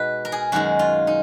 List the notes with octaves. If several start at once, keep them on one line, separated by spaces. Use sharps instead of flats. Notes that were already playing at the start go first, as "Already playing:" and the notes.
Already playing: B2 G#3 D#4 F#4 B4
A#4
G#4
F#2 D#3 G#3 F#4
F4
D#4